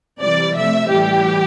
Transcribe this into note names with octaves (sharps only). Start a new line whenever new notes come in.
C3 E3 G3 D5
C3 F3 A3 E5
A2 E3 G3 G4